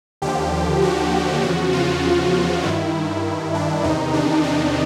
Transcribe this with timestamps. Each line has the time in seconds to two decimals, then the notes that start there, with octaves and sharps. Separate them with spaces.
0.22 D#2 D3 F3 G4
0.82 F#4
1.43 E2 C#3 F3 F#4
1.73 F4
2.63 G2 D#3 E4
3.54 D4
3.84 E2 C3 D#3 D#4
4.14 D4
4.44 D4